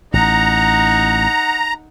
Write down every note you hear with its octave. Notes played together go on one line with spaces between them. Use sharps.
A1 D#4 F#5 A#5